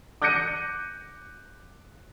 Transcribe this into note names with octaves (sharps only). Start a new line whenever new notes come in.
D6 F#6 G6 A#6 C#7 D#7